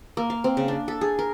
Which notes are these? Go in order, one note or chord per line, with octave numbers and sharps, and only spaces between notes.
A#3
F5
C4
C#3
D4
A4
G#4
A#4